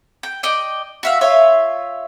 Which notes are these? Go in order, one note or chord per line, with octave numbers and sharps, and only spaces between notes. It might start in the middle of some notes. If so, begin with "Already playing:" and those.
G5
D5 D#5 G5
F#4 E5 F5
F4 C#5 E5